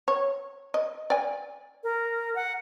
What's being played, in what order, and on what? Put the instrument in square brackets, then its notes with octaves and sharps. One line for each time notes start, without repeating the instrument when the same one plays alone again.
[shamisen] C#5
D#5
D5 G#5
[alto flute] A#4
F#5